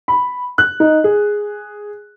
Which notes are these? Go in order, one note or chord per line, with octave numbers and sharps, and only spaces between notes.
B5
F#6
D#4
G#4